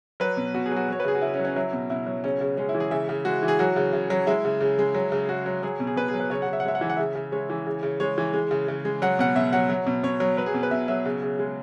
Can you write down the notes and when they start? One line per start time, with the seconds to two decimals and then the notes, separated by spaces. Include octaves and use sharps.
0.20 F#3 B4
0.37 B2
0.54 B2 F#4
0.66 G#4
0.71 F#3 F#4
0.89 F#3 C#5
1.00 B4
1.05 C#3 G#4
1.15 F#4
1.22 C#3 E4
1.34 C#4
1.39 F#3
1.45 C#4
1.56 F#3 E4
1.73 B2
1.90 B2 E4
2.06 F#3
2.24 C#3 C#4
2.41 C#3
2.57 G#3 C#4
2.69 E4
2.75 E3
2.80 G#4
2.91 C#3 E5
3.09 C#3
3.25 G#3 F#4
3.43 E3
3.48 G#4
3.59 F#3 F#4
3.76 C#3
3.93 C#3
4.10 F#3
4.27 G#3 E4
4.45 C#3
4.61 C#3
4.79 G#3
4.94 F#3
5.12 C#3
5.29 C#3 F#4
5.46 F#3
5.63 F#3 G#4
5.80 B2
5.87 G#4
5.96 B2 B4
6.08 G#4
6.14 F#3
6.20 B4
6.30 C#3 C#5
6.42 F#5
6.48 C#3
6.53 E5
6.60 F#5
6.65 G#3 E5
6.75 F#5
6.81 E3 E5
6.90 F#5
6.97 C#3 E5
7.15 C#3
7.32 G#3 C#5
7.50 E3
7.66 C#3
7.83 C#3
8.00 G#3 C#5
8.18 E3
8.33 G#3
8.51 C#3
8.68 C#3
8.85 G#3
9.02 F#3 F#5
9.19 B2 F#5
9.36 B2 E5
9.53 F#3 F#5
9.70 F#3
9.87 B2
10.03 B2 C#5
10.20 F#3
10.37 F#3 B4
10.46 G#4
10.54 B2
10.63 B4
10.71 B2 E5
10.88 F#3 E5
11.05 C#3
11.22 C#3
11.39 G#3